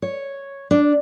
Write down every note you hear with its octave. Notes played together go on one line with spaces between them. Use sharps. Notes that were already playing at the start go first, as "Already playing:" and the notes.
C#5
D4